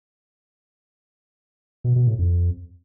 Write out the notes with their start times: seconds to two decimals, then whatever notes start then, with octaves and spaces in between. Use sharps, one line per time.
1.84 B2
1.96 B2
2.07 A2
2.19 F2